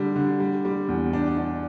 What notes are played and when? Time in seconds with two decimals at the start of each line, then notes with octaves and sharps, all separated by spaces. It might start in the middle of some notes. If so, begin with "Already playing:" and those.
Already playing: D3 G3 D4
0.16 D3
0.40 G3
0.65 G3
0.88 E2
1.13 D4
1.37 D4